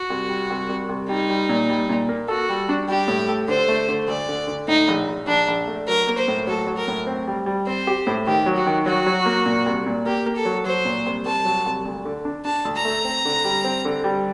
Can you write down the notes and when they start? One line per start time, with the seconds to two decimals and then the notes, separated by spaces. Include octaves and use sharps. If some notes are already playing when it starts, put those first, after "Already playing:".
Already playing: F#4
0.10 C2
0.29 G3
0.50 C2
0.69 C2
0.89 C2
1.09 G3 D#4
1.30 G3
1.49 A#2
1.70 G3
1.89 A#2
2.09 A#3
2.28 F#4 A4
2.49 G3
2.69 D4
2.88 G3 G4
3.08 A2
3.28 A4
3.48 D3 C5
3.68 A3
3.88 D3
4.08 D2 D5
4.29 D3
4.47 D3
4.68 A2 D#4
4.88 A#1
5.08 A#1
5.27 A#1 D4
5.48 A#1
5.67 A3
5.88 F#3 A#4
6.07 A#3
6.18 C5
6.28 A2
6.47 F#3 A4
6.67 F#3
6.77 A#4
6.88 A2
7.07 C4
7.27 G3
7.46 G3
7.67 C4 C5
7.87 G4
8.07 A2
8.27 D#3 G4
8.46 F#3
8.57 F#4
8.66 D#3
8.86 F#3 F#4
9.06 F#3
9.26 A#3
9.46 A#2
9.66 C2
9.86 A#2
10.06 A#3 G4
10.26 A#3
10.36 A4
10.45 F#3
10.65 F#3 C5
10.85 A#2
11.06 C2
11.25 C2 A5
11.45 F#3
11.66 C2
11.85 D2
12.05 D3
12.25 D4
12.45 D4 A5
12.65 D2
12.75 A#5
12.85 A3
13.05 C4
13.25 D3
13.45 G3
13.65 C4
13.85 D3
14.04 G3